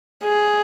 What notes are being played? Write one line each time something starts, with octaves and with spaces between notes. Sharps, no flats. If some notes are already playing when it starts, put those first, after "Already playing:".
G#4